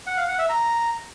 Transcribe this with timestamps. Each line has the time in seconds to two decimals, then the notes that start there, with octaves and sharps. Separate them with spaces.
0.07 F#5
0.17 F5
0.28 F#5
0.39 E5
0.49 A#5